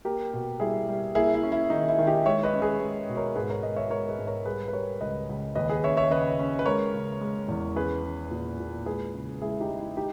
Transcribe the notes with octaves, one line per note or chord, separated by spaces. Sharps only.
A#3 G4 A#4
B2
G3 E4 G#4
G3
A#3 E4 G#4
E4
C#4
E4
D#3 D#4
E4
D#3
D#4 G4
G#3 C#5 E5
B4 D#5
C#4
G#4 B4
G#3
B2
A#4 C#5
G#2 G#4 B4
A#4 C#5
G#3 B4 D#5
C#5 E5
G#3 A#4 C#5
G#4 B4
G#2
A#4 C#5
G3 G#4 B4
B4
G3 A#4 C#5
C#2 B4 D#5
C#2
D#2 B4 D#5
G#4 B4
C#4 C#5 E5
C#5 E5
C#3 B4 D#5
C#4
B4
G#3 A#4 C#5
C#3
G#3
E2
C#4 G#4 B4
C#4
A#2
A#2
G#3 G#4 B4
C#3
G#3 E4 G#4
D#4 G4
G#3
E4
D#4 G4